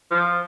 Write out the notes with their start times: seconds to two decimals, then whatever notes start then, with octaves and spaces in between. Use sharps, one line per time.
0.11 F3